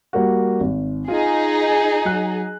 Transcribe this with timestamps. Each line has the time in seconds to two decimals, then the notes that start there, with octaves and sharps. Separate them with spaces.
0.13 G3 A#3 F#4
0.60 G#1
1.08 D#4 F4 G#4
2.05 F#3 F#6